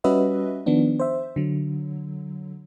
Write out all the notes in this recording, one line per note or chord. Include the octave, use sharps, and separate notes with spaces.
G3 C#4 F#4 B4 D#5 E5
D#3 F3 B3 D4
C5 E5
D3 F#3